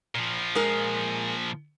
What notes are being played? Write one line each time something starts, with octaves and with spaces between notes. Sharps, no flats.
A#2 F3
G#3 A#4